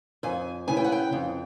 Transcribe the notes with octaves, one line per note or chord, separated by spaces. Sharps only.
F2 G#5
C#3 E3 G#5
G5
F#5
G5
F2